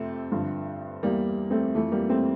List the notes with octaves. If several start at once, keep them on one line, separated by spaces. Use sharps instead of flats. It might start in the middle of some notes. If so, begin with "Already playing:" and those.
Already playing: F2 C3 A3 C4
G2 D3 F3
E2 E3 G3 A#3
A3 C4
F2 E3 A3
G3 A#3
A3 C4